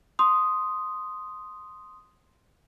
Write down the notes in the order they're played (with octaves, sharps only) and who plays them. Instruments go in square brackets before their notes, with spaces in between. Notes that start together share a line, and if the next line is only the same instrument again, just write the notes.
[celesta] C6 D#6